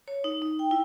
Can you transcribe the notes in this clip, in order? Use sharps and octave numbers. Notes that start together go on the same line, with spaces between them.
C#5
D#4
D#4
G5
E4